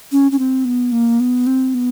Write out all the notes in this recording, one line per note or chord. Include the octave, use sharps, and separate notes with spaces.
C#4
C#4
C4
B3
A#3
B3
C4
B3